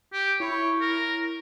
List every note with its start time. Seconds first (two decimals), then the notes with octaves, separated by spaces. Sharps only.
0.13 G4
0.40 E4 C#5
0.81 A#4